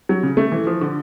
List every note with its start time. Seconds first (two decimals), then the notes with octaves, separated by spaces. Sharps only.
0.09 F#3
0.23 C#3
0.37 A3
0.52 E3
0.67 F3
0.81 D3